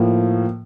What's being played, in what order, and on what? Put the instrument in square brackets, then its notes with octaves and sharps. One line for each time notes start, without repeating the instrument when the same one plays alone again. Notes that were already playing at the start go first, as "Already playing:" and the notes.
Already playing: [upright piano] A2 F3 A#3